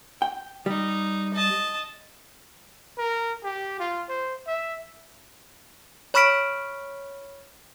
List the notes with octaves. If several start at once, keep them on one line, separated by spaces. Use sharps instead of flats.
G5
G3 D#4
D#5 A5
A#4
G4
F4
C5
E5
C#5 B5 C#6 F6 B6 D7